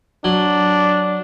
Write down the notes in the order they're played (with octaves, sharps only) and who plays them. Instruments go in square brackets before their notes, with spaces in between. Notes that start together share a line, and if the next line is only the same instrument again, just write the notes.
[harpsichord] F#3 [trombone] D4